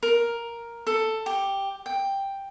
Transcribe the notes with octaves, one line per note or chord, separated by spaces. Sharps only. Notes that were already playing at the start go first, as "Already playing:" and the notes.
A#4
A4
G4
G5